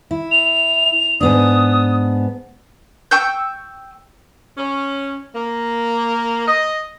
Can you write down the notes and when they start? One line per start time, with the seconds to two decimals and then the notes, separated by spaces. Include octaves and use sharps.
0.11 E4
0.31 F7
1.21 G#2 B3 D4 D#6
3.11 G5 C#6 E6 G6
4.58 C#4
5.35 A#3
6.47 D#5